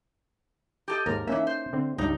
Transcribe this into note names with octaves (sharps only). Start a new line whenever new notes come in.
G4 A4 D#5
D#2 G#2 A#4
E3 A#3 C#4 D#4 E5
C5
D3 C4
C#2 G2 G3 D#4